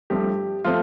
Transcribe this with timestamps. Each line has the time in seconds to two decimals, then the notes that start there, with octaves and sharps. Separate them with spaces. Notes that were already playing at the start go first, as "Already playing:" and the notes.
0.10 G2 F3 A3 C4 G4
0.64 F3 A3 C4 F4